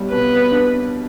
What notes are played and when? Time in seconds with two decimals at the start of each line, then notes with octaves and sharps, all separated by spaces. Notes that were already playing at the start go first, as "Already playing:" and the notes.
Already playing: B1 G3
0.12 B2 B4
0.52 D4